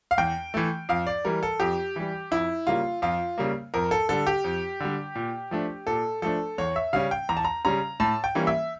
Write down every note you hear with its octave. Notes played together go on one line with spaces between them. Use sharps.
F5
E2 G5
E3 A3
F2 F5
D5
E3 G3 A#4
A4
F2 G4
E3 G3
F2 E4
C#3 G3 A#3 F4
F2 F4
C#3 G3 A#3
F2 A#4
A4
D3 G3 A4
G4
F2
D3 G3
A#2
F3 A3 D4
A#2 A4
F3 A3 D4 A4
E2 C#5
E5
C#3 G3 C#4 F5
G5
E2 A#5
A5
A#5
C#3 G3 C#4 A#5
A2 A5
G5
E3 G3 A#3 C#4
E5